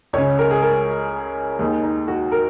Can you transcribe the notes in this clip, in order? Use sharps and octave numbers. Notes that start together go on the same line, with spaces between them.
C#2 C#3 C#5
A#4
G#4
A#4
D#2 D#3 G#4
D#4
F#4
A#4